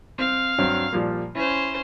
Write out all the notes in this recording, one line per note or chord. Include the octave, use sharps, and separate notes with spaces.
C4 F5
G2 F#3 C4
A#2 F3 G3
C#4 E4 C5